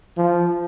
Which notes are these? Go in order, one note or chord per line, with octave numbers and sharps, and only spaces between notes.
F3